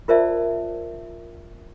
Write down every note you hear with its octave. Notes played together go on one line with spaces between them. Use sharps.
F4 A#4 C5 D5 E5 A5